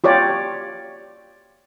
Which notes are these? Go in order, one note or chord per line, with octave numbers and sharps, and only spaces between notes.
F4 G4 C#5 D5